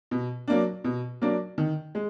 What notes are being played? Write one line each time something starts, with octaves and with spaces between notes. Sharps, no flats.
B2
F#3 A#3 D4
B2
F#3 A#3 D4
D#3
G#3